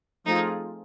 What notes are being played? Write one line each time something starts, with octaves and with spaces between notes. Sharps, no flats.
F3 A3 C4 D#4 F4 G#4